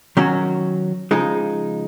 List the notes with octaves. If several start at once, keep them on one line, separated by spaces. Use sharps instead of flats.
D#3 F#3 C#4 F#4
C#3 F3 G#3 D#4